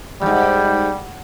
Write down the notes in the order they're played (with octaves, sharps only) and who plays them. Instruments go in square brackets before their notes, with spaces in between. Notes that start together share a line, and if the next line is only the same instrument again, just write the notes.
[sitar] E2 G#2 [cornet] G3